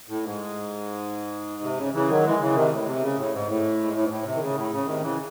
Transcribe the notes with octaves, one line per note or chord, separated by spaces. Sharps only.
A2
G#2
C3
C#3
C#3 E3
D#3 F#3
E3 G#3
C#3 E3
C3 D#3
A2
C3
C#3
A2
G#2
A2
G#2
A2
G#2
A2
C3
D#3
C#3
A2
C#3
C3 D#3
C#3 E3